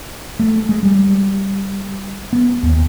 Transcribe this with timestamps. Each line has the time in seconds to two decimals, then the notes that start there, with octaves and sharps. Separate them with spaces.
0.39 A3
0.69 G#3
0.83 G3
2.33 B3
2.63 D#2